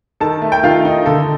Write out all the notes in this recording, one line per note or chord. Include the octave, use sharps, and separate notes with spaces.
D#3 A4 A5
A3
G5
D#3 F4 F5
D#4
D3 A4